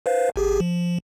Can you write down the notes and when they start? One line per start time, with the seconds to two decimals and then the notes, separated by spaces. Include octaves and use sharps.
0.06 B4 C5 F5
0.36 G#1 G4 G#4
0.60 F3